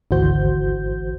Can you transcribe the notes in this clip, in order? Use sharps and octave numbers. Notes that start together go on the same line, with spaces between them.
G#1 D2 E3 F#4 C5 G6